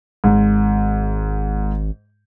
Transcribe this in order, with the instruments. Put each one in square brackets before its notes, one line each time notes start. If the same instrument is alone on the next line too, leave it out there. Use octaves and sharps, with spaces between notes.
[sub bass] G#1 [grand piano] G#2